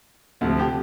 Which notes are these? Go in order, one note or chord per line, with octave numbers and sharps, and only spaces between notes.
D2 C3 F3
G4